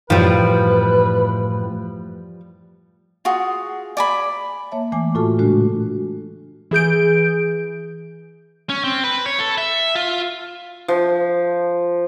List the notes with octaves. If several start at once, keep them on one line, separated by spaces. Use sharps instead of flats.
F#2 A2 E3 F3 G3 B4
F4 F#4 G#4
D5 G#5 B5
A#3 C#5 E5 A5
E3 A3 G#5 D6
A2 F4 F#4 A4 A5 F6
A#2 C#3 G#3 A3 D4 F#4
E3 G#4 G6 D7
C#4
C4
B4
C#5
A4
E5
F4
F3